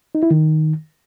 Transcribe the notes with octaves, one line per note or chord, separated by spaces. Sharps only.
D#4
E4
D#3